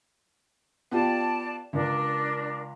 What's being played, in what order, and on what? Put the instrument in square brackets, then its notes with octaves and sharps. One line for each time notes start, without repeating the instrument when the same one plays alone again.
[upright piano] B3 F4 G4 [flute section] D5 A5
[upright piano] C#2 [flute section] D4 A#4